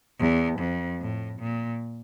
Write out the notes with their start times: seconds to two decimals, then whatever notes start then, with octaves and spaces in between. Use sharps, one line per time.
0.20 E2
0.59 F2
1.00 A2
1.40 A#2